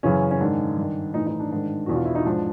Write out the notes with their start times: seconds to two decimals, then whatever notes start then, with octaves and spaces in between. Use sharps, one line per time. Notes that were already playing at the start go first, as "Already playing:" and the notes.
0.03 F#2 C#3 E3 C#4
0.31 C#4
0.40 G#2 D#3 D4
0.77 G2 D#3
1.14 A2 E3 D#4
1.27 D#4
1.40 D4
1.51 G#2 D#3 D4
1.86 E2 B2 F#4
1.96 F4
2.05 E4
2.15 D#4
2.25 G#2 F3 D4